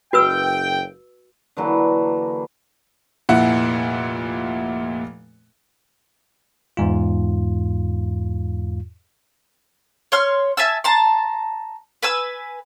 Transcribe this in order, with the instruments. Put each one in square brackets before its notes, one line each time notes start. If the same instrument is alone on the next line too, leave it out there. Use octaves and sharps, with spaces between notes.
[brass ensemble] F#1 G5 [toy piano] F#4 B4 E6
[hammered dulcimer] D3 E3 F#3 A#3
[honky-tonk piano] F1 A#2 E4 F#5
[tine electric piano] E2 G#2 F4
[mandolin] C#5 C6 F6
E5 G#5 A5 E6
A5 A#5 C6
B4 G#5 E6